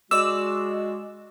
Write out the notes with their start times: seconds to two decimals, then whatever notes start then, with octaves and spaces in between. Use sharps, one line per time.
0.11 G#3 F#4 D5 E6